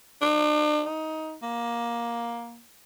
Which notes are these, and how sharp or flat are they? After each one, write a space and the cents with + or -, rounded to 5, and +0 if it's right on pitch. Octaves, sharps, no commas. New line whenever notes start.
D4 +40
D#4 +15
A#3 +15